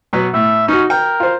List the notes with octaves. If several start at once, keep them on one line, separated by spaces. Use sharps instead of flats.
B2 F#3 B3
A2 E5
C#4 D#4 F#4
A#4 G5
F4 C5